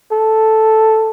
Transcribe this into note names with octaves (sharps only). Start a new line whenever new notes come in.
A4